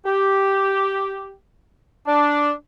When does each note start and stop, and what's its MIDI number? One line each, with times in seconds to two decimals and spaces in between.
0.05 1.32 67
2.07 2.51 62